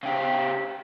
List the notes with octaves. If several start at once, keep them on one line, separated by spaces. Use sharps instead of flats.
C#3 G4